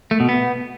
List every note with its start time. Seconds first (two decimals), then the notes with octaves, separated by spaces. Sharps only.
0.11 A3
0.20 B2
0.29 B3